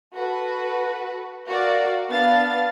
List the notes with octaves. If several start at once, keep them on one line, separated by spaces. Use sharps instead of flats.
F#4 A4 B4
F#4 A#4 D5 F5
B3 D4 F5 A6